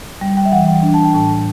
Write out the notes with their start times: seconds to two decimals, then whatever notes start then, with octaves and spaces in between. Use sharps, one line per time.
0.21 G3 G5
0.37 G5
0.46 E5
0.52 E3 F#5
0.67 G5
0.83 D4
0.94 A5
1.04 G5
1.14 A2 A5